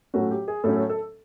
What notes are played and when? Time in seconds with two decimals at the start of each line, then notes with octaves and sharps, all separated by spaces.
0.14 A2 F#3 A3 C#4 F#4
0.31 G4
0.48 G#4
0.64 A2 F#3 A3 C#4 A4
0.77 A4
0.90 A4